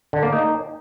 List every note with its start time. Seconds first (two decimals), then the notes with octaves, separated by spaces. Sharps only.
0.13 D3
0.23 A#3
0.32 D#4